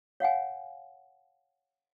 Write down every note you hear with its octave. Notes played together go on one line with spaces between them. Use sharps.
C#5 F5 F#5 G#5